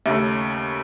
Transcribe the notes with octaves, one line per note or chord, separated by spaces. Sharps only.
D#2 C#3 A3